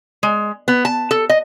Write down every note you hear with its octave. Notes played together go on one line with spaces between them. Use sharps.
G#3
B3
A5
A4
D#5